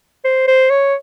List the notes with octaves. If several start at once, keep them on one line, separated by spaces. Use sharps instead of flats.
C5
C5
C#5